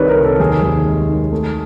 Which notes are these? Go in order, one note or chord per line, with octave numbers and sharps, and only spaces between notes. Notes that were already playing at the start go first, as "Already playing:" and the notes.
Already playing: C2 D#3 G3 B4 C#5 D5
A#4
C3
A4
D#2 G#4
D#2
G#3
D#3
A3